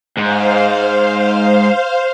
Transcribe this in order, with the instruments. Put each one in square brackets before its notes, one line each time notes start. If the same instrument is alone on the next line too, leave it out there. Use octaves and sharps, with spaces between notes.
[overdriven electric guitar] G#2 [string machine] C5 F5